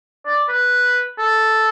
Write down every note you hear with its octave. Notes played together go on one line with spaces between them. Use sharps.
D5
B4
A4